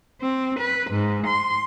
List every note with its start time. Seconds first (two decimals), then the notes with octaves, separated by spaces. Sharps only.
0.22 C4
0.59 B4
0.91 G#2
1.27 C6